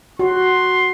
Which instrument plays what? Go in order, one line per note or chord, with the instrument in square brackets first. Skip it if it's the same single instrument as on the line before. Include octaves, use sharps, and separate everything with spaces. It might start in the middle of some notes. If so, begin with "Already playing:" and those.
[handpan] F#4 [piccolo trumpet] C6